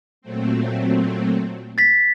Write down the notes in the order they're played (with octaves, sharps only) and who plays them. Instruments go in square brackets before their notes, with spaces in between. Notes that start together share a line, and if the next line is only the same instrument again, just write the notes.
[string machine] A#2 F#3 A3 C4
[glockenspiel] A6 B6